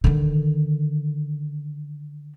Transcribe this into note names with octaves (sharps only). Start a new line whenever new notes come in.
D3 D#3